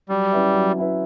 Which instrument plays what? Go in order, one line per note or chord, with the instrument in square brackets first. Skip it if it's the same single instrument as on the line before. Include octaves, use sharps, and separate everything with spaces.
[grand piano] F#3 [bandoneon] G3
[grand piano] C#4 E4 B4 E5
F#3
C#4 E4 B4 E5